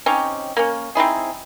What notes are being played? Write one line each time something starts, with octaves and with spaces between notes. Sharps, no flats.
C4 C#4 D#4 G4
A#3 C#4
C4 D#4 E4 G#4